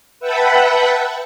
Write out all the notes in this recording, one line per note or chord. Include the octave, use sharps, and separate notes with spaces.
B4 E5 F#5 G5 A5 B5